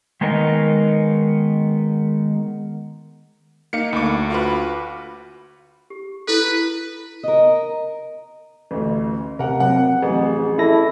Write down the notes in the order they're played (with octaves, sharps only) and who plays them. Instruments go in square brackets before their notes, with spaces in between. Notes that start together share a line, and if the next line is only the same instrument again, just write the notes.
[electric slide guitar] D#3 G#3 B3 D#4 A#4 D#5
[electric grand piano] A#3 D#4 F5 [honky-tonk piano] C#7
[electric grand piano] D2 [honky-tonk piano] B5 D6
[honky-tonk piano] F4 F#4 B4
[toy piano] G4
[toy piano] E4 A4 [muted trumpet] B4
[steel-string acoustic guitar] A#4 D#5
[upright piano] A1 D2
[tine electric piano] C3 [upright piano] A#4 F#5
[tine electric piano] F#3 C4 [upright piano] F#5
[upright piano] A1 F2 [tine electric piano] G#4
[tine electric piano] E4 A4 A#6